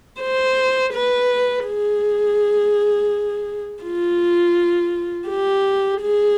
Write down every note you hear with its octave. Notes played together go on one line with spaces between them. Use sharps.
C5
B4
G#4
F4
G4
G#4